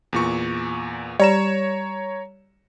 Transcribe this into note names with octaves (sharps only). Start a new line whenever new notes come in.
E2 A#2 C#6
G3 C#5 A#5 E7